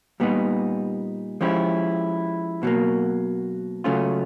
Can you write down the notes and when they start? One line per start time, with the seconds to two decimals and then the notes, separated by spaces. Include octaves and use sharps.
0.20 A#2 G3 B3 D#4
1.41 F3 G#3 C#4 E4 G4
2.63 B2 F#3 A#3
3.84 C#3 F#3 A3 C#4 F4